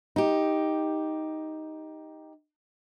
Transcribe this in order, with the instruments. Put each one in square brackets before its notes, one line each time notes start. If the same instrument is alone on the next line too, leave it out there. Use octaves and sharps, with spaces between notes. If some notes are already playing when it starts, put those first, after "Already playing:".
[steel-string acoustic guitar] D#4 G4